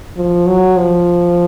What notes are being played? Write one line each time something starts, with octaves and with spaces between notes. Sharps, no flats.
F3
F#3
F3